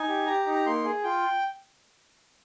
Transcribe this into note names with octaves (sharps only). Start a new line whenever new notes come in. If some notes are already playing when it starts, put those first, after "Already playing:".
Already playing: D#4 G#5
G4
G4 A#5
D#4
A#5
A#3 C6
G#4
F4 G5